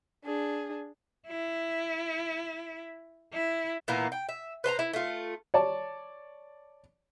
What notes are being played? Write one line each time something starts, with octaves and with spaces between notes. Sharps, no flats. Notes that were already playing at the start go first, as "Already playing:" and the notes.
D4 G#4
E4
E4
A#2 E3 A#3 B3
G5
E5
B4 C5 A5 A#5
E4
A3 F4
C#5 D5 A5